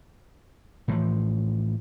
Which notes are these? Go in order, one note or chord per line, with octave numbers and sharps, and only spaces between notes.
A2 E3 F3